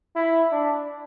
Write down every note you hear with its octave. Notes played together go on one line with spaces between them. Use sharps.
E4
D4